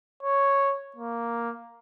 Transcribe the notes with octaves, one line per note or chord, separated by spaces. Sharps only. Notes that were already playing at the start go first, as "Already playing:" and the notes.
C#5
A#3